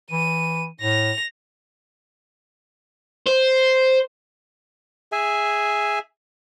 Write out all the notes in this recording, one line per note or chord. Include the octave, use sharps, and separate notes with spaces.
E3 D#7
A2 A#6 F7
C5
G#4 E5 G#5